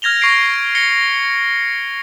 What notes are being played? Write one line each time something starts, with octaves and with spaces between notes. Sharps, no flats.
F6 G#6 A#6 F7 G7
C#6 A#6 C7 D7
A#6 C#7 G7